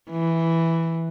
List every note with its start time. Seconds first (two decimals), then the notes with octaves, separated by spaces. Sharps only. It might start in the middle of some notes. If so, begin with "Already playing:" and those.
0.10 E3